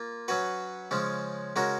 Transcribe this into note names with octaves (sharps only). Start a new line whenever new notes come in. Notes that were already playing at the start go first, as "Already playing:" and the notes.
Already playing: A#3 F4
F#3 C#4 F#4 B4
C#3 F3 G#3 C#4
C#3 G#3 C#4 F#4 A#4